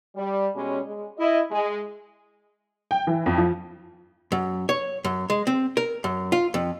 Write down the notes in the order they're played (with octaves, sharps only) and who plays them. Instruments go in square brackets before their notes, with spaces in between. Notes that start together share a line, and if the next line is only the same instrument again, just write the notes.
[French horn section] G3
B2 G3 G#3 C#4
G#3
E4 D#5
G#3
[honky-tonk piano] G5
E3
F2
F3
[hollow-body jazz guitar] F#2
C#5
F#2
G#3
C4
A#4
F#2
F4
F2